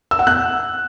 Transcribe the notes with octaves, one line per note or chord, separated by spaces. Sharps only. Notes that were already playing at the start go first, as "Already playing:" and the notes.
E6
F#5
F#6